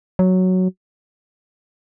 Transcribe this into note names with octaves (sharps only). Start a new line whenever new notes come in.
F#3